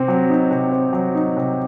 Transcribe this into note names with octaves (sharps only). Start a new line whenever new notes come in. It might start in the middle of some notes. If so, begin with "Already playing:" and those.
Already playing: C3 C4
F#3
D#4
C3
C4
F#3
D#4
C3